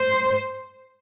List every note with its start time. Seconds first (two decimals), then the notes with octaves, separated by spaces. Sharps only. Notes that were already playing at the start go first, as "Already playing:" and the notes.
Already playing: C5